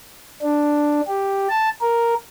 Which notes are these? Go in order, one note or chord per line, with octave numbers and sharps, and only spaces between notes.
D4
G4
A5
A#4